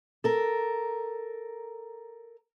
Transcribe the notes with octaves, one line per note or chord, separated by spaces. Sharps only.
A4 A#4